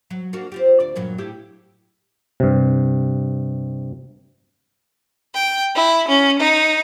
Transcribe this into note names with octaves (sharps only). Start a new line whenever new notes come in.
F#3
A#3 D4 F#4
C4 F4 G4
D2 D5
G2 A#2 F#3
A2 E4 G4
G2 C3
G5
E4
C#4
D#4